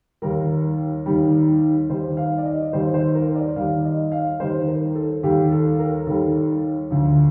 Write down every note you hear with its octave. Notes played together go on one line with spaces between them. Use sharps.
D#2 D#3 G3 A#4
D#2 D#3 G3
D#2 D#3 G3 C5
F5
D5
D#5
D#2 D#3 G3 C5
C5
A#4
D5
D#2 D#3 G3 F5
D#5
F5
D#2 D#3 G3 C5
A#4
A4
D#2 D#3 G3 G4
A4
A#4
D#2 D#3 G3 A4
D2 D3 F3